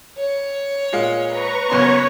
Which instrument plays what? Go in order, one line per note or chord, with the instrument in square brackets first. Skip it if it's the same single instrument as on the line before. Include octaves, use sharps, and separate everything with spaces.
[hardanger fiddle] C#5
[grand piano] A#2 G#3 F5
[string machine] B4 A#5 C#6
[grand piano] F#1 C#4 C6 [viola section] B3 C#5